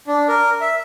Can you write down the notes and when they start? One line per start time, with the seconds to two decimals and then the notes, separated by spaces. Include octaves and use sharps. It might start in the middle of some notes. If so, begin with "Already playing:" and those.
0.07 D4
0.28 A#4
0.61 E5